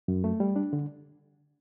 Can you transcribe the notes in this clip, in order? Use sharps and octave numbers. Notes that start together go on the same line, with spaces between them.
F#2
A3
G3
D4
D3